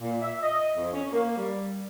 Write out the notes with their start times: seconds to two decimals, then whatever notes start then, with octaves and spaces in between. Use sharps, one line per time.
0.02 A#2
0.22 E5
0.43 D#5
0.77 F2
0.94 C#4
1.13 A#3
1.37 G3